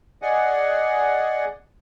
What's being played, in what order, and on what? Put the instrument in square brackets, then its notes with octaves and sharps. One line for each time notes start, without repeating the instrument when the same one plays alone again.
[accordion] G#4 D5 D#5 F#5 G#5